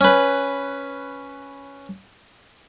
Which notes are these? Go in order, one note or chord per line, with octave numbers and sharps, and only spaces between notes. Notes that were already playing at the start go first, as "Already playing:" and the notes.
C#4 B4